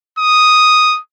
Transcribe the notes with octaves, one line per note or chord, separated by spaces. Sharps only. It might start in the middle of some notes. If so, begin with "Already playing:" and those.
D#6